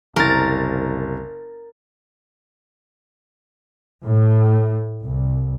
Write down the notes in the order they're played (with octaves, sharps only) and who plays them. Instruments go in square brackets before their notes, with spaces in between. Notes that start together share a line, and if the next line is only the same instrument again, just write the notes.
[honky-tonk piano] F#1 A6 [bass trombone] C2 [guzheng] A#4
[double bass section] A2
C2